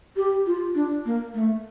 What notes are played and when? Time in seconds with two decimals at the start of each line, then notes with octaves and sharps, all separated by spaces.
0.16 G4
0.47 F4
0.75 D4
1.05 A#3
1.34 A3